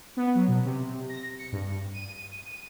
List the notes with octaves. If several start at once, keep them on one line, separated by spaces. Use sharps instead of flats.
B3
F#3
B2
C3
A#6
C#7
G2
D#7